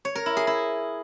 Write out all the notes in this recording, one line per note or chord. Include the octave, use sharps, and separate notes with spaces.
C#5
A#4
E4
G#4
E4